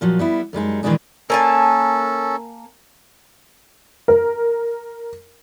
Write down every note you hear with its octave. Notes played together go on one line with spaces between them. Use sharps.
A#2 F3 F#3
G3 B3 E4
F#2 G3 G#3 D#4
A#2 D#3 E3 G#3 D4 G#4
A#3 C#4 A4 G#5 A5
A#4